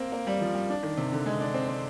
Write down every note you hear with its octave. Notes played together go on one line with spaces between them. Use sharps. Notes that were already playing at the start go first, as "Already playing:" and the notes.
Already playing: A#3 C4
A#3
G3
F3
G3
D4
D#3
C3
D3
G#3
D4
C4
C4